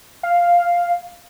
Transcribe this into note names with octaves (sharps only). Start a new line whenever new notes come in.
F5